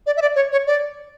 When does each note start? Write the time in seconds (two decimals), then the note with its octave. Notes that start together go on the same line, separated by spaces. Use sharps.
0.06 D5
0.17 E5
0.22 D5
0.36 C#5
0.52 C#5
0.67 D5